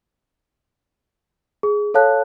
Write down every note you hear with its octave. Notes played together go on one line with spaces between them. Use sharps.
G#4
A4 C#5 F5 A5 F#6